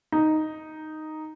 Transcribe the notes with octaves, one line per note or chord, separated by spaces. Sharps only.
D#4